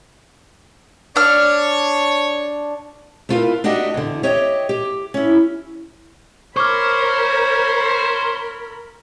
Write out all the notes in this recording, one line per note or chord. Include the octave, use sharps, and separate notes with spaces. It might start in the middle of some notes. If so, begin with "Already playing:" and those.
D4 C#5 F6
A3 E4 F4 G#4 A#4 B4
D4 D#4 F#4 G4 D#5 E5
E2 D3
G4 C#5 D#5 E5 G5
G4
C#4 E4
A#4 C5 C#5 B5 C#6 D6 F6